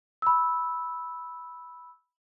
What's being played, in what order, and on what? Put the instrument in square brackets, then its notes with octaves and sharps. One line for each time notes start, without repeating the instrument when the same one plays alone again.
[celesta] B5 E6